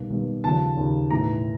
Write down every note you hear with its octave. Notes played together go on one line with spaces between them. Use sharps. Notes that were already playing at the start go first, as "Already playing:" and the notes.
Already playing: B1 B2 G3 A#3
B1 B2 G3 A#3
D#2 C#3 F3 A5
D#2 C#3 F3
B1 A2 E3 A#5